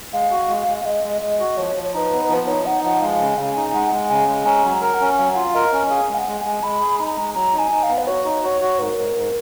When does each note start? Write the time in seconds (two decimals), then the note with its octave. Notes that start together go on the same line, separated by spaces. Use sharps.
0.13 G#3 F5
0.31 F#4
0.49 G#3
0.67 G#3
0.85 G#3 D#5
1.04 G#3
1.21 G#3 D#5
1.40 F#4
1.57 F3 C#5
1.76 F3
1.83 C#5
1.94 D#4 C#5
1.97 B4
2.12 B3
2.29 F3 B4
2.47 D#4 C#5
2.66 D#4 F#5
2.84 F3 F#5
3.02 G#3 F5
3.20 C#3
3.38 C#3 G#5
3.56 D#4
3.73 G#3 F#5
3.92 G#3
4.10 C#3 G#5
4.28 G#3
4.46 C#4 A#5
4.64 F#3
4.70 A#5
4.82 A#4
4.94 F#5
5.01 C#4
5.18 F#3 F5
5.34 F4 F#5
5.44 F5
5.54 A#4 D#5
5.73 C#4
5.90 G#4 F5
6.08 G#3
6.15 G#5
6.19 F#5
6.27 G#3
6.39 G#5
6.44 G#3
6.63 G#3 B5
6.81 G#4
6.98 D#4 A#5 B5
7.17 G#3
7.34 F#3 A#5
7.53 D#4
7.59 G#5
7.71 D#4
7.83 F5
7.89 B3
7.98 B4
8.07 F#4 C#5
8.25 D#4
8.43 F#4 C#5
8.61 F#4
8.79 G#2 A#4 B4
8.97 G#2
9.15 G#2